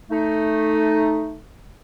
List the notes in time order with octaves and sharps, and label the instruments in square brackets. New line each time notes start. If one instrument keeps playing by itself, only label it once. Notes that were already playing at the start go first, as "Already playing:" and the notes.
[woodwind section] A3 D#4